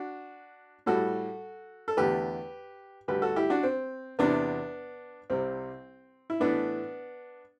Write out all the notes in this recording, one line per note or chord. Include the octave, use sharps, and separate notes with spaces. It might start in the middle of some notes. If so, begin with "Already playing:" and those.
Already playing: D4 F#4
A2 G3 F#4 A4
A4
E2 D3 A3 G4 B4
D2 D3 G3 G4 B4
F#4 A4
E4 G4
D4 F#4
C4
E2 C3 E3 B3 D4
C2 C3 G3 C4
E4
A2 E3 A3 B3 D4